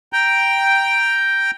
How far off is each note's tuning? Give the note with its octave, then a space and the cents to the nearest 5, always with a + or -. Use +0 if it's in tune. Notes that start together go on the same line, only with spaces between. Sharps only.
G5 +0 A#5 +5